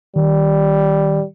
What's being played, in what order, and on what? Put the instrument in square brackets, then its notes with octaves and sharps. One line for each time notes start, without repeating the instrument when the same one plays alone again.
[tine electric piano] D#3 [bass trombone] G3